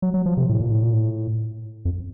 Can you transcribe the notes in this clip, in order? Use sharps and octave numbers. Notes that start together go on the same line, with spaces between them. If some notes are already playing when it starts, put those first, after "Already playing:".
F#3
F#3
F3
C3
A2
A#2
A2
A#2
A2
F2